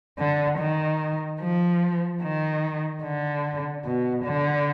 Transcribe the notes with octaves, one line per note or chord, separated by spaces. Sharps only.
D3
D#3
F3
D#3
D3
B2
D3